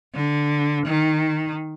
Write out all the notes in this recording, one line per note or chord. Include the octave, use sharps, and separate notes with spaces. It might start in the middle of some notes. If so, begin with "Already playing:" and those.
D3
D#3